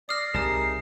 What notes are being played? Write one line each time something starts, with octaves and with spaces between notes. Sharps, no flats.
D5 D#6 F6 A#6 C7
C2 D#4 G4 G#4 A#4 A5 D#6